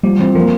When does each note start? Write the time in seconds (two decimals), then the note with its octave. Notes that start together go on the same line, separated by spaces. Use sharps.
0.03 F3 G3
0.19 E3 C4
0.35 F3 A#3